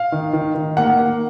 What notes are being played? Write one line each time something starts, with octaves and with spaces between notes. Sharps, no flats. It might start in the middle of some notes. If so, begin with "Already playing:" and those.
Already playing: F5
D#3
D#3
D#3
A#3 F#5
A#3